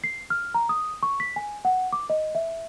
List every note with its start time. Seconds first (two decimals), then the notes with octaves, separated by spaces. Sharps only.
0.04 C7
0.30 F6
0.55 A#5
0.69 D#6
1.03 C#6
1.20 B6
1.36 G#5
1.65 F#5
1.93 D6
2.10 D#5
2.35 E5